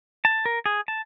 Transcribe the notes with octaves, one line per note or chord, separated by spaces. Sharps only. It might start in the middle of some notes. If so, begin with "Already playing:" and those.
A5
A#4
G#4
A5